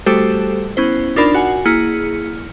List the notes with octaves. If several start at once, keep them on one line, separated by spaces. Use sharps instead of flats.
G3 A3 F#4 G4 A4 C5
B3 C#4 E4 C5
D4 D#4 F4 A#4 D5 B5
F#4 F#5 G#5
A#3 E4 G#4 F6 C#7